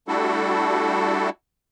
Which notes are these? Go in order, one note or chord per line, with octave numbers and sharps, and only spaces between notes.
G3 A3 D4 E4 F#4 A4